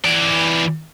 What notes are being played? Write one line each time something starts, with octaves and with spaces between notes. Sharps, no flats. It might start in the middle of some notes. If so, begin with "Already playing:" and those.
E3 D5